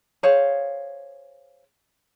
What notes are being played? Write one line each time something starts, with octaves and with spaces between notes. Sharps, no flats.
G#4 C5 C#5 F5